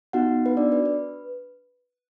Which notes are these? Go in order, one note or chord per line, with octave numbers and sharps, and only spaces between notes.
B3 D#4 F#4 F#5
B4
D4 D5
B4
B4